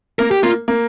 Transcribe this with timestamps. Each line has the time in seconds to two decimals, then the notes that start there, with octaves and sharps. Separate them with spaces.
0.19 A#3 A#4
0.31 G4
0.43 A#3 F4
0.68 A#3